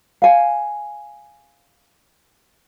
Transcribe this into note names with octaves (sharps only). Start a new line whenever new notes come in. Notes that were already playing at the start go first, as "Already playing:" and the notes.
F5 G#5